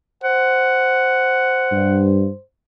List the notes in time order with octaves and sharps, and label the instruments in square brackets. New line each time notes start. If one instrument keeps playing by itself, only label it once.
[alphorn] C5 [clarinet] F#5
[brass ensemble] G2